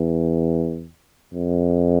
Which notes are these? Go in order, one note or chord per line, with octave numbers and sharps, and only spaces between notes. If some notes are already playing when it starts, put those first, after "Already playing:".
Already playing: E2
F2